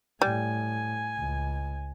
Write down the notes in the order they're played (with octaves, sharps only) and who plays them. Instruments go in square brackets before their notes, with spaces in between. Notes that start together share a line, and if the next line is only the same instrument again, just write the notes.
[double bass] A2 [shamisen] G3 [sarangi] G#5
[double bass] C#2